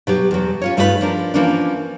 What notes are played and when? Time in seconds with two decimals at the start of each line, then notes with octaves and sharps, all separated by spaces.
0.07 B2 F#3 G4
0.31 E2 F#3
0.62 C#4 F4 C#5
0.77 G2 A3 D#4 F4 F#4 B4
1.01 F3 D4 A#4
1.34 E3 F3 A#3 C#4 D4